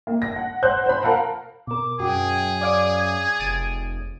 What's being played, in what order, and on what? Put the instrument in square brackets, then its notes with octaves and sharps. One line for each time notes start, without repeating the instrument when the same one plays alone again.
[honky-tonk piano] A#3
A#6
F#5
C5 F#5 F#6 G6
C5 B5
A#4 F5 F#5 A5 A#5
[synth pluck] B2 A#4 [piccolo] D6
[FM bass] F#2 [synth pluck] F#4 [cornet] G#4 [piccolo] G5
[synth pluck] D5 F5 D6 [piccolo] G#6
[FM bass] F1 [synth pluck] A6 D7 D#7